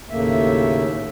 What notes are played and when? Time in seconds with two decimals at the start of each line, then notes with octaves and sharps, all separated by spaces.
0.10 D#2 A2 C#3 A3 A#3 E5